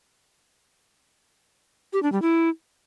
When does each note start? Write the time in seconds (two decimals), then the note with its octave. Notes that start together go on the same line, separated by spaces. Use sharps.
1.93 G4
2.03 D4
2.12 G3
2.22 E4